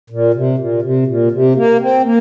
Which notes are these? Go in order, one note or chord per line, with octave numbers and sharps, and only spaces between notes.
A#2
C3
A#2
C3
A#2
C3
A#3
C4
A#3